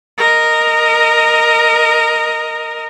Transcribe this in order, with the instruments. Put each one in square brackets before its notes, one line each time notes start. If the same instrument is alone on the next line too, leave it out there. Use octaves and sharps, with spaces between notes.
[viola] A#4 D#5